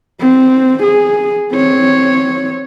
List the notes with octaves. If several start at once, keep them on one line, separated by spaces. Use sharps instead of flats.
C4
G#4
C4 C#5